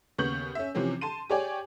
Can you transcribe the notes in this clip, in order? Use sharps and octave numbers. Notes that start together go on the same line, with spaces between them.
D#2 C#3 B3 C#6 G6 F#7
C#4 E5
C3 E3 F3 C4 C#4
A5 C6 D#7
G4 G#4 C#5 D5 G5 G#5